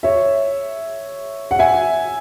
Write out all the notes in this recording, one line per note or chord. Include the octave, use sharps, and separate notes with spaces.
C#5 E5
F#5
E5 G#5